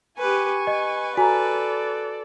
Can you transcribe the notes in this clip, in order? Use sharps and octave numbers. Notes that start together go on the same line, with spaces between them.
G4 B4 G#5 C#6
B4 D#5
F#4 A4 D5 G#5 A#5